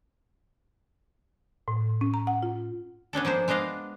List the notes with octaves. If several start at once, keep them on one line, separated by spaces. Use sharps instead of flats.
A2
C#4
A#5
F#5
F4
B3 C#4 D4 A4
F3 A#3 G#4 C5
G#3 B3 D4 D#5 F5